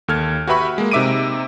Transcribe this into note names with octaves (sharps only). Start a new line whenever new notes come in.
D#2 A4 F6 G#6
F#4 G4 B4 E5 B5 C#6
G#3 A#3
C3 D#4 E5 D6 D7 D#7